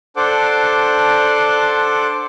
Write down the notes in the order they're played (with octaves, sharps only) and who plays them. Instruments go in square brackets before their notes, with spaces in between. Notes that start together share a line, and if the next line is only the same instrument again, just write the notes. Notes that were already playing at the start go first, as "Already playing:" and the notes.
[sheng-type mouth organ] D4 A4 C5 F#5 D6